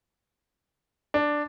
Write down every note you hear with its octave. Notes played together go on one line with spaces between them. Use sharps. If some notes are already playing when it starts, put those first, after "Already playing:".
D4